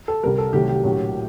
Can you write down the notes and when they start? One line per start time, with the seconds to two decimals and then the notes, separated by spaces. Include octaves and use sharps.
0.08 A4
0.23 C2 C3 G3 A#4
0.38 A4
0.53 C2 C3 D#3 F#3 A3 G4
0.69 G4
0.84 A#1 A2 F#3